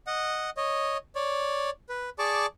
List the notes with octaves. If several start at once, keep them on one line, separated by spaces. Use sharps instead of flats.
D#5 F#5
C#5 D#5
C#5 D5
B4
G#4 D5 A5 C#6 D6